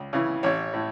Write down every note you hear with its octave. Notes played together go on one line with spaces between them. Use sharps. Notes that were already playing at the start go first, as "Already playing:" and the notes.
Already playing: C#2
C#3 E3
A1 C#5
A2